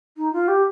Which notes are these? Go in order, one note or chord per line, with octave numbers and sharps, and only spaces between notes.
D#4
F4
G4